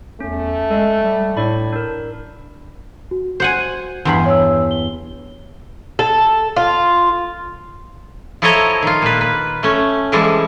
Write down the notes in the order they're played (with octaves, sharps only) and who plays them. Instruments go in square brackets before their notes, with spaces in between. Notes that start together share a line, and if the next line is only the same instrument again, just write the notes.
[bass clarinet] E2 [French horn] A3 [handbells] C#4
[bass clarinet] G#3 [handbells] A4
[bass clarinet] G3
[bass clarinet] A2 [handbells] D4 D5 B5
[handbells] D4 A#4
[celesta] F#4
[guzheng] C5 F#5 G#5
[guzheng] E2 G2 B5 [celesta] C6 C7
[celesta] C#5 E6
G7
[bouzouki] A4
F4
[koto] F3 E4 A4 C#5 D#5 A#5
D#3 F4
A#2 B4
B4
A3 C#4
E3 F3 G3 G#3 A4